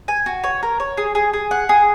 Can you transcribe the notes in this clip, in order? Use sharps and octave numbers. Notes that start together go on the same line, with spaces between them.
G#5
F#4
C#5
A#4
C#5
G#4
G#4
G#4
F#5
G#4